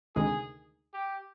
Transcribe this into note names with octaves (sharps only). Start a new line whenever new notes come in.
D2 C3 D#3 G#3 G#4
G4